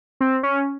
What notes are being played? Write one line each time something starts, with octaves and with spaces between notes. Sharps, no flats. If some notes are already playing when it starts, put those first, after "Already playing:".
C4
C#4